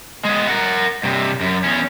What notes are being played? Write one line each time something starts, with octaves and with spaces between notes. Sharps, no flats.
G#3 B3
A#4 F#5
G2 C3
F#2
E2 C#4